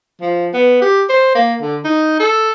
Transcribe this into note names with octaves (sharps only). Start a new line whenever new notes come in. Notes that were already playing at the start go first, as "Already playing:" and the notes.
F3
B3
G4
C5
A#3
D3
D#4
A4